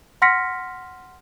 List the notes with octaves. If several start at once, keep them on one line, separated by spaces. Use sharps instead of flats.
F#5 C6 F6 A#6 B6 C#7